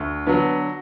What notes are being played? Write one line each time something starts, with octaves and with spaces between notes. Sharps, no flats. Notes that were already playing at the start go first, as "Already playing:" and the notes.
Already playing: D2
D3 F#3 B3